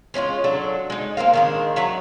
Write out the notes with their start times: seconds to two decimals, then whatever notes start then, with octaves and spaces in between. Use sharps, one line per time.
0.14 G#3 C#4 E4 F4
0.44 F#3 D4 A4
0.90 G#3 D#4
1.17 A#3 C4 A#4 F5
1.33 D#3 G#3 D4
1.76 F#3 E5 F#5 A#5